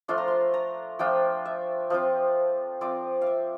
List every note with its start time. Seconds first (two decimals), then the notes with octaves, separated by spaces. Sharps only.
0.08 F3 A3 D4 F4 C6
0.18 A#5
0.28 C6
0.54 A#5
0.99 F3 A3 D4 F4 G5
1.45 E5
1.90 F3 C4 F4 F5
2.81 F3 C4 F4 D5
3.21 E5 F5